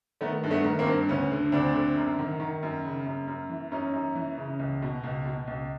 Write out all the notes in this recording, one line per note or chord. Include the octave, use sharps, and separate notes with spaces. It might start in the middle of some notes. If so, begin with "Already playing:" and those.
D#3 A3 B3
G2
A3 B3
D#3
A#3 C4
G2
D2 B3 C#4
D3
D2 C4 D4
D3
F#2
D#3
D#3
F#2
C#3
F#2
F#2
E3
F#2 C#4 D#4
F#2
E3
C#3
C#2
B2
C#2
B2
C#2